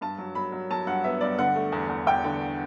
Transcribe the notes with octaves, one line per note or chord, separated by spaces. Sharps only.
G2 A5
F#3
F#3 B5
F#3
F#3 A5
G2 F#5
B3 E5
G2 D5
D3 F#5
A3
E2
E2
E2 G5
D3